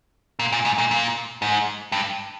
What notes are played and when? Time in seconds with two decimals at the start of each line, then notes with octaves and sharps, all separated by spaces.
0.39 A#2
0.52 A#2
0.65 G#2
0.78 A#2
0.91 A#2
1.42 G#2
1.92 G2